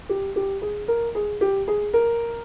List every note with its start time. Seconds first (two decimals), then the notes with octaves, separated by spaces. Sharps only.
0.09 G4
0.36 G4
0.62 G#4
0.88 A#4
1.15 G#4
1.41 G4
1.68 G#4
1.94 A#4